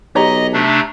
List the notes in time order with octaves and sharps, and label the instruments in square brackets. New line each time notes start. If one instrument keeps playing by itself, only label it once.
[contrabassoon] B1 [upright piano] G4 C#5 A#5 [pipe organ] D#5
[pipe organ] C3 A3 D4